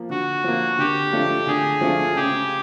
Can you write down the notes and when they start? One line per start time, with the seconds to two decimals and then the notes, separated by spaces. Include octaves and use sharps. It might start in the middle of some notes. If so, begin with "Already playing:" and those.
Already playing: F3 A#3
0.10 D3 F#4
0.44 F3 A#3
0.79 D3 G4
1.13 F3 A3 D4 F4
1.47 D3 G#4
1.81 F3 A3 D4 F4
2.15 C#3 G4